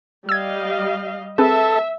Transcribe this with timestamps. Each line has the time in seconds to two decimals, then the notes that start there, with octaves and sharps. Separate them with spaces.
0.29 G3 D#5 F5 E6 G#6
1.38 C4 G#4 A4 B4 E5